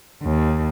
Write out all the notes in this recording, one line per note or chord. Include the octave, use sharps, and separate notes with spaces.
D#2